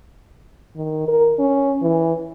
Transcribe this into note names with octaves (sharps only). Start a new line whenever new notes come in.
D#3
A#4
C#4
E3